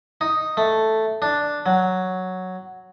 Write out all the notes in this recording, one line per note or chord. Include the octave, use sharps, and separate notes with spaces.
D#4
A3
D4
F#3